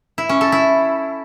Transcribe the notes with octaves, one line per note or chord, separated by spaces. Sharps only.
E4
C#4
A4
E4